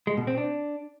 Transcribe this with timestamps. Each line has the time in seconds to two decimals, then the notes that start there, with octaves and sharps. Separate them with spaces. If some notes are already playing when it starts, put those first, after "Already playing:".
0.07 G#3
0.17 B2
0.27 C4
0.37 D4